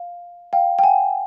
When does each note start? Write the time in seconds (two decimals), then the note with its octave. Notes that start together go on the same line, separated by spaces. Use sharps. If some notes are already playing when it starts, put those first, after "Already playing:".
Already playing: F5
0.53 F5 G5
0.79 G5
0.83 F#5 G#5